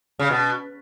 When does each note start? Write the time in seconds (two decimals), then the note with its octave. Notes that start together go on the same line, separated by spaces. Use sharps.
0.19 C#3
0.30 B2